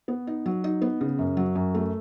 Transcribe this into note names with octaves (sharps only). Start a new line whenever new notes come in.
B3
D#4
F#3
D#4
B3
C#3
F#2
F#3
F#2
A3